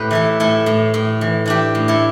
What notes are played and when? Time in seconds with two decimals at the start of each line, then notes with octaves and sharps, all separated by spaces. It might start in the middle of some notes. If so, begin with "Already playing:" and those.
Already playing: A2 G4 B4
0.11 E3 E4 A4
0.40 A2 E4 A4
0.66 A2
0.94 A2
1.21 E3
1.46 E3 D4 G4
1.75 A2
1.88 E4 A4